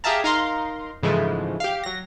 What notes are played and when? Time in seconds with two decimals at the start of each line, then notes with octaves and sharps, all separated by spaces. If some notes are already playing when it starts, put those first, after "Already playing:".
0.04 G4 G#4 E5 F5 A5 A#5
0.24 D#4 A#4 F5 A#5 C6
1.03 G#2 C#3 E3 F3 G#3 A3
1.60 G4 F5
1.84 F#3 A#6